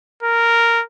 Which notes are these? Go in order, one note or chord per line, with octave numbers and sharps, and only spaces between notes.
A#4